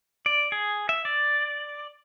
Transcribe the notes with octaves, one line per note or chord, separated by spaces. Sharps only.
D5
G#4
E5
D5